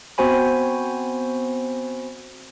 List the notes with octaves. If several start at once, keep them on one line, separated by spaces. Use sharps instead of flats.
B3 C4 F#4 C5 G#5 B5